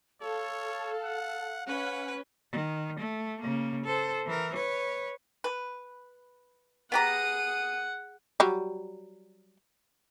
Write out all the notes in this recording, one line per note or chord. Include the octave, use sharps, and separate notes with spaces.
A4 C#5 F5
F#5
C#4 B4 F#5
D#3
A3
C#3 A#3
A4 C5
E3 A#4
B4 C#5
B4
B3 G4 G#4 F#5 A#5 D#6
F#3 G3